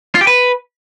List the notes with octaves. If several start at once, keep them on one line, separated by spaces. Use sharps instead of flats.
F4
G4
B4